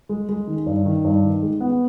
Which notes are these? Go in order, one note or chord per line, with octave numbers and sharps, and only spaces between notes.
G#3
G#3
D#3
G2
D#3
G2
D#3
G#3
B3